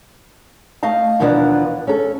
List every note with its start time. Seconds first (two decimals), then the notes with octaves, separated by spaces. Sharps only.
0.83 A3 D#5 F5 A5
1.19 D#2 B2 E3 F3 B3 D4
1.87 C#4 A4